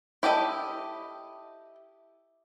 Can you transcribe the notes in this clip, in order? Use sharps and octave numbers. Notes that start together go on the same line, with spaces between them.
E4 G4 A4 D#5